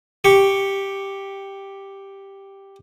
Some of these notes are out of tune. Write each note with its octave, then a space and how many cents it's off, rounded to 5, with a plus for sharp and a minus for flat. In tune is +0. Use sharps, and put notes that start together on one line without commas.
G4 +0 C#6 +0